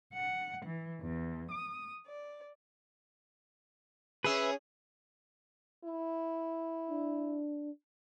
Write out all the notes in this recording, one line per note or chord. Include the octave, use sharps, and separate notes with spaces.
F#5
E3
E2
D#6
D5
C#4 G#4 B4 E5
E4
D4